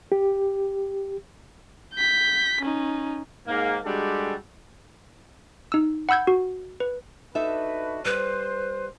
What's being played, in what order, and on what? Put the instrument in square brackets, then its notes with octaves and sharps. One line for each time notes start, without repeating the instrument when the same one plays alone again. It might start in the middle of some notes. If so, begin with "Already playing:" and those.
[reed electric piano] G4
[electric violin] G6 B6
C#4 D#4
[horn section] G#2 A#3
G3 G#3 D4 F#4 G4 A4
[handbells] D#4 E6
F#5 B5 E6 G6 G#6
F#4
B4
[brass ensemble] D4 F#4 B4 [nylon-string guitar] D#4 A4 E5
[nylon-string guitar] G3 [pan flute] B4 [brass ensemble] C5